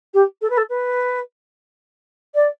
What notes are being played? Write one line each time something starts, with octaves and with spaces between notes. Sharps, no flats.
G4
A4
B4
A4
B4
D5